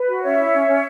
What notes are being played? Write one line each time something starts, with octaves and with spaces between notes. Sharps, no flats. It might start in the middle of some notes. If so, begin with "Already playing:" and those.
Already playing: B4
F#4
C#4 C#5 E5
E4
C#4
C#4